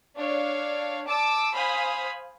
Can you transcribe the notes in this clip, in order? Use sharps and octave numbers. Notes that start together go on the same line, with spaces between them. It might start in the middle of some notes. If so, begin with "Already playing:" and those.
D4 C#5 F5
A5 D6 E6
C5 F5 G#5 B5 D#6